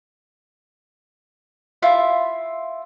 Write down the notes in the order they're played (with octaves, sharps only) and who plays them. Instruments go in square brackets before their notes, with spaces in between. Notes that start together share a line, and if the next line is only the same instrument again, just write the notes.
[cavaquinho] E4 F4 E5